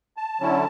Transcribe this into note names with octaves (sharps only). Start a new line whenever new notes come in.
A5
D3 F#3 C#4 E4